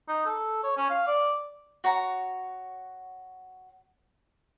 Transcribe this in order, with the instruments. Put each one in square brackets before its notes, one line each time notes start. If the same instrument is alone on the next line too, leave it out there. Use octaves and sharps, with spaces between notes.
[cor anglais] D#4
A4
C#5
C#4
F5
D5
[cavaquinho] F#4 C#5 A#5